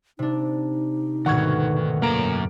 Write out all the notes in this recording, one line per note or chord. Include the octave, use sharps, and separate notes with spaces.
C3 D4 D#4
D2 G#2 B2 D#3 F#5 C#6 G#6
F#2 A#3 A#5 D7